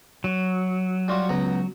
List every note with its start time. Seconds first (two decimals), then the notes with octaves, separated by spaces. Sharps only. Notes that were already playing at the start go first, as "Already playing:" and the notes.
0.24 F#3
1.08 G3 F4 F#4
1.29 C#2 B3 A#5